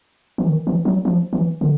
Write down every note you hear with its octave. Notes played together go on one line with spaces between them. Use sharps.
E3
D#3
E3
F#3
F3
E3
D3